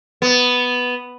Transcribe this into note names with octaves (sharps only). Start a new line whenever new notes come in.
B3